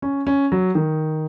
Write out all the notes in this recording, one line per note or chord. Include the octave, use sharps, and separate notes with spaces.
C#4
C#4
F#3
D#3